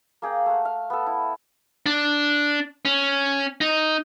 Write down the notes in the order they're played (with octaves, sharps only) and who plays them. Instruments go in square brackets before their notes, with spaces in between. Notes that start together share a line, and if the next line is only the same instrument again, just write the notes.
[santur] A#3 G#4 G5 A#5
A3 F#5
F5
B3 A4
E4
[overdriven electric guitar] D4
C#4
D#4